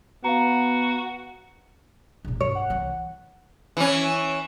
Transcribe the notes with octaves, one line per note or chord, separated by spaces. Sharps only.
B3 F#4 F5 A#5
E1 A#2
G2 C#5
F#5
C2 E3
E3 C#4